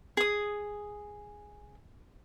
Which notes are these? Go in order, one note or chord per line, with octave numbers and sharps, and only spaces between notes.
G#4 D#6